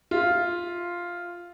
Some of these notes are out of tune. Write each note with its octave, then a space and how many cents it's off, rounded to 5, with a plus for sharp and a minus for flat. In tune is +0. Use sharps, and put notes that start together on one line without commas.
F4 +0 E5 -20